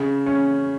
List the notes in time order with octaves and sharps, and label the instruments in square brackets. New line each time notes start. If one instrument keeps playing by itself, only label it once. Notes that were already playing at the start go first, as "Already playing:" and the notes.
Already playing: [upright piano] C#3
C#4